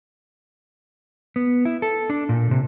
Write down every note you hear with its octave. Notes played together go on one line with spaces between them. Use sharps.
B3
E4
A4
D4
A#2
C3